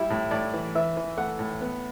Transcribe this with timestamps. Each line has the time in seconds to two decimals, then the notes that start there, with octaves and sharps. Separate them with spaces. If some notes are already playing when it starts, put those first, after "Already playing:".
Already playing: G3 E4
0.10 A2
0.31 A2 D5
0.53 E3
0.75 E3 E5
0.97 E3
1.17 A3 F#5
1.39 A2
1.61 B3